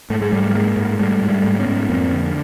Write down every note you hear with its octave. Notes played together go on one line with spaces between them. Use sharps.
G#2 A3
G#3
G#2 G3 A3
G#2 G#3 A#3
G#2
G#2 G3 A3
G#2
G3 A3
G#2
B3 C#4
G#2
F2 A#3 C4
D3